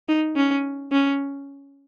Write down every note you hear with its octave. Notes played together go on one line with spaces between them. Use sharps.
D#4
C#4
C#4